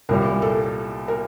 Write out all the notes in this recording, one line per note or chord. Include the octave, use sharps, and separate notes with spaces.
C2 A#2 G3 A#4
A4
A#4